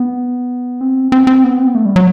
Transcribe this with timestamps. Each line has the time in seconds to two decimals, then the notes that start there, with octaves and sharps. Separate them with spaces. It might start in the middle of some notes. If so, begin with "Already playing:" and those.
Already playing: B3
0.81 C4
1.12 C4
1.27 C4
1.44 B3
1.59 C4
1.67 B3
1.75 A3
1.86 G3
1.96 F#3